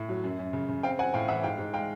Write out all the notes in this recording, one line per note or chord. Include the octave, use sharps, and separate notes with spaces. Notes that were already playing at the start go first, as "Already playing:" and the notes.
Already playing: A2
F#3
F#2
F#2
C#3
C#3
C4 F5 G5
C4 F#5 G#5
A2 F5 G5
E3 E5 F#5
G#2 F5 G5
G#2
G#3 F5 G5